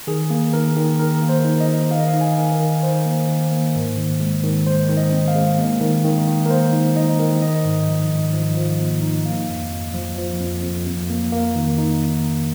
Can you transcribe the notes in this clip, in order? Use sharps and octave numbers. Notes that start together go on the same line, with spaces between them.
D#3 G#4
A#3
D#3 A#4
D#3
D#3 A#4
A#3
C5
D#4
D#5
D#4
D#3 F5
D#5
F5
D#4
G#5
D#3
A#4
D#3
D#4 C5
A#3
D#3
A#3
G#2
D#3
G#3
D#3
G#3 C5
D#3
D#5
C4
F5
G#3
A#3
D#3
D#3
D#3
A#4
A#3 C5
D#4
D#4 D#5
D#3
D#4 D#5
G#2
F3
G#2
F3
F3
A#3
D#4
A#3 F5
F2
F2
F3
F3
F2
F2
F2
A#3
A#3
D#3
D#4